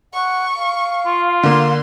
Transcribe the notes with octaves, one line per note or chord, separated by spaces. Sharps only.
F#5 C#6
F5
F4
D3 A#3 C6